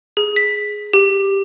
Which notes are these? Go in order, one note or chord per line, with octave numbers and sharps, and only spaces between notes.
G#4
B6
G4